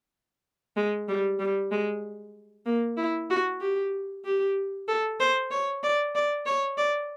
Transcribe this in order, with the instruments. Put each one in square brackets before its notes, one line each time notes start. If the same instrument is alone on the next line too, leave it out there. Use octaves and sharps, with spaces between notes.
[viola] G#3
G3
G3
G#3
A#3
E4
F#4
G4
G4
A4
C5
C#5
D5
D5
C#5
D5